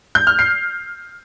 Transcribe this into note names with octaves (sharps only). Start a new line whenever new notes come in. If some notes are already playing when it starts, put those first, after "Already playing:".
G6
F6
C7